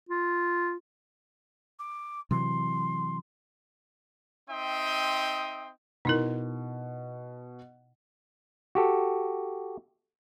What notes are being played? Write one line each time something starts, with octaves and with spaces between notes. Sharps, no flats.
F4
D6
C3 E3 F#3 C6
C4 D#4 E5 G5 C6 D#6
B2 D#4 E4 A#4
F#4 G4 A4